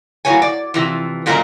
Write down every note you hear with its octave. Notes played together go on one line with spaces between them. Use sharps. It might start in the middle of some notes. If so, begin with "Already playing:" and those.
A2 F#3 A#3 C#5 G#5
D5
C3 E3 F3
F#2 A#2 G#3 A#3 C4 A#4